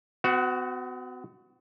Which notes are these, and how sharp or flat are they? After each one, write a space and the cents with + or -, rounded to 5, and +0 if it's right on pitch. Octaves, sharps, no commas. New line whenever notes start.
B3 +45 F#4 +0